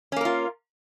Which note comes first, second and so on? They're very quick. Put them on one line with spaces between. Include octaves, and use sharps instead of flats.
C#4 A#3 A#4 F4